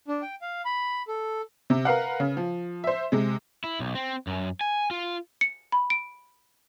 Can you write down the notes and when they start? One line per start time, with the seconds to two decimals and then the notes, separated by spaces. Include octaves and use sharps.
0.08 D4
0.22 G5
0.42 F5
0.65 B5
1.08 A4
1.70 C3
1.85 A#4 B4 F5 F#5
2.20 C#3
2.37 F3
2.84 C5 E5
3.12 C3 G#3
3.64 E4
3.80 B1
3.95 C4
4.27 F#2
4.61 G#5
4.91 F4
5.41 C#7
5.72 B5
5.90 D7